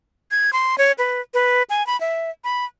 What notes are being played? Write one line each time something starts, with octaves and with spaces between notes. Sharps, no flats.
G#6
C6
C#5
B4
B4
G#5
B5
E5
B5